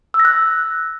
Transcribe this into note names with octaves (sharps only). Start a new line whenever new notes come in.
E6
A#6
F#6